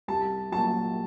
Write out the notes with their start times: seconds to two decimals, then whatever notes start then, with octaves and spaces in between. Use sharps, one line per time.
0.08 C2 A5
0.52 A#2 F#3 A5